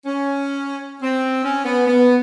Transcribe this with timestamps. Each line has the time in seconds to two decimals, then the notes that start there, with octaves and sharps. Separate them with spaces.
0.05 C#4
1.01 C4
1.44 C#4
1.65 B3
1.86 B3